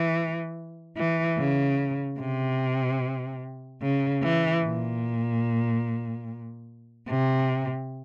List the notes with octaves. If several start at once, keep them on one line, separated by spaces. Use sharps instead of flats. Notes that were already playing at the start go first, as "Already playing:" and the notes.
Already playing: E3
E3
C#3
C3
C#3
E3
A#2
C3